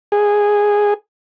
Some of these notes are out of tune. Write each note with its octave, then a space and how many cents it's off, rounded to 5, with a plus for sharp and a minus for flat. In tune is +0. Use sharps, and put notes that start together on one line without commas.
G#4 -10